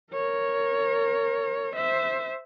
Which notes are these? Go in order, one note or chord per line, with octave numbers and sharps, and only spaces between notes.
A#4 C#5
C5 E5